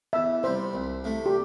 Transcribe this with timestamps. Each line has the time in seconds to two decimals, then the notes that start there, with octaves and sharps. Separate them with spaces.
0.13 E2 E5
0.43 C3 G3 C5
0.74 C2
1.04 C3 A3
1.26 G4